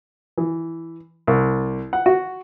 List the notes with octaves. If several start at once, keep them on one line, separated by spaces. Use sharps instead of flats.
E3
C2
F#5
F#4